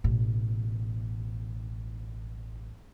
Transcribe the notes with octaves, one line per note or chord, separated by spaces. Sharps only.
A1 B2